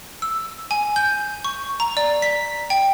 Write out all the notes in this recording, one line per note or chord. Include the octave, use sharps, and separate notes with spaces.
E6
G#5
G6
C#6
A#5
D5
B6
G5